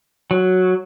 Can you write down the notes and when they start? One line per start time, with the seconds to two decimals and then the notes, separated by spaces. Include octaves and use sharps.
0.31 F#3